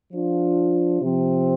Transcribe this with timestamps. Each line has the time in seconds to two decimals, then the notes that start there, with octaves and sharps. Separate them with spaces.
0.11 F3 D4 F4
1.01 C3 F3 C4